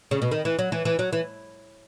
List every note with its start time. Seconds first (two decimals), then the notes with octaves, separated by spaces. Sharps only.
0.11 C#3
0.22 B2
0.31 D#3
0.45 E3
0.59 F#3
0.72 E3
0.85 E3
0.99 F#3
1.13 E3